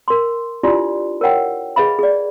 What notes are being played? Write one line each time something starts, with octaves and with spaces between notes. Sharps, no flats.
A#4 C6
D4 E4 F4 G4 D5 C6
A#4 C#5 F#5 G5
G#4 B4 D#5 F5 B5
G#4 D5